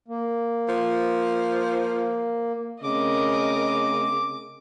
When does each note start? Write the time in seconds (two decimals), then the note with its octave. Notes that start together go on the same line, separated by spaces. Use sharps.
0.08 A#3
0.69 F3
2.83 C#3 A3 C4 C#4 A#4 D#5 D6